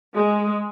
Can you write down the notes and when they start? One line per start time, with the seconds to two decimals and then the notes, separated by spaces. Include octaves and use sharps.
0.15 G#3